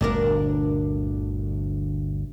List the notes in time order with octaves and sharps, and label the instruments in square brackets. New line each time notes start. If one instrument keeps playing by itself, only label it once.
[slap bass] G1 D2 [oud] A#2 D4 A#4